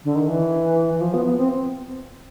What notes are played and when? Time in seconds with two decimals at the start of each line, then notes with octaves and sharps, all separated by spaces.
0.04 D3
0.15 D#3
0.27 E3
0.94 E3
1.01 F3
1.14 B3
1.25 B3
1.37 C4